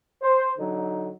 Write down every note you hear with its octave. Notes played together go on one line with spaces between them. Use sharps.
C5
D3 F#3 D#4